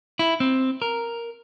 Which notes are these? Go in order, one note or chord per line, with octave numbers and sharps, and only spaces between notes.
E4
C4
A#4